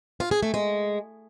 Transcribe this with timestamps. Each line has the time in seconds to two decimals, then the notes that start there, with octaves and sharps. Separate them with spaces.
0.20 F4
0.31 G#4
0.43 A3
0.54 G#3